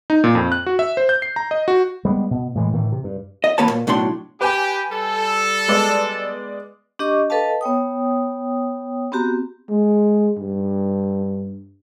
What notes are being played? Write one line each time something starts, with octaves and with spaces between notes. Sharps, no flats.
D#4
A#2
F2
F#6
F#4
E5
C5
G6
C7
A#5
D#5
F#4
G3 G#3 A#3 B3
B2
A2 E3 G#3
A2 D#3 E3
C3
G2
D#5
D#2 A#3 B4 C#5 A5
A#2
B1 A2 F#3 D4 C6
G4 B4 G#5
G3 A4
G#3 B3 D5
D4 G4 D#5 C#6 D6
A4 B4 D#5 F5 A5
B3 C#5 G5 D#6
B3 C4 F#4 G4 A#5
G#3
G2